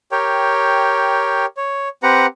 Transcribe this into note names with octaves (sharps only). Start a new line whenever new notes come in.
G4 A#4 C#5 G5
C#5
C4 G4 B4 F#5 A#5